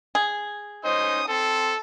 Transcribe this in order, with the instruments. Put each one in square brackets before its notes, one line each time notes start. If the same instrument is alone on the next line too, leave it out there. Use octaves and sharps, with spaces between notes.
[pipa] G#4
[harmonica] C#4 D#4 D#5 [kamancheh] C5 [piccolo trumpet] D#6
[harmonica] C4 [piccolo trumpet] A4 [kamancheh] A5